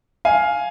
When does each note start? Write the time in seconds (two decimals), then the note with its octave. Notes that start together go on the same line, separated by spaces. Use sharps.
0.25 F5 G#5